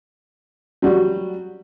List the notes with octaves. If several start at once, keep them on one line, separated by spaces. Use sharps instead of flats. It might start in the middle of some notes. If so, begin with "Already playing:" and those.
F#3 G3 F#4